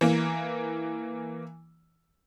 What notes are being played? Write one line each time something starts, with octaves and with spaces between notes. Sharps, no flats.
E3 A#3